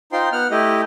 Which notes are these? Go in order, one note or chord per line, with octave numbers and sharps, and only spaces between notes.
D#4 F4 C5 G5 C6
B3 F#5 F6
A3 E4 G4 D#5